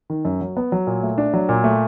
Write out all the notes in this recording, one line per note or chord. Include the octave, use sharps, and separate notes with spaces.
D#3
F#2
F#3
B3
F#3
A#2
A3
D4
F#3
A#2
A3